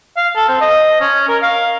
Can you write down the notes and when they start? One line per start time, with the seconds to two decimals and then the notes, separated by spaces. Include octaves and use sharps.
0.17 F5
0.36 A4
0.48 C4
0.61 D#5
1.01 C#4
1.28 A#4
1.42 F5